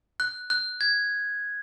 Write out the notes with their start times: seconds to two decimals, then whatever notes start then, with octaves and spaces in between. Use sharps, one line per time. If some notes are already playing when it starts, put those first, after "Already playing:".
0.20 F#6
0.50 F#6
0.81 G#6